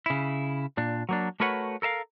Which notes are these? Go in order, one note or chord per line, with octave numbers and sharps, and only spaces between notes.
C#3 E4
A#2 D4
F#3 A#3 D4
A3 F#4 A#4 B4 C#5 F#5
A4 A#4 E5 F5